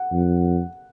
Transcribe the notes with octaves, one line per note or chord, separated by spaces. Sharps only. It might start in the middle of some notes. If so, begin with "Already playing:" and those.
Already playing: F#5
F2